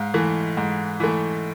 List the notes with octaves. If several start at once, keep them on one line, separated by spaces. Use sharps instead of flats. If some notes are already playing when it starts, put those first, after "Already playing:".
Already playing: G#2 F5
E3 A3
G#2
E3 A3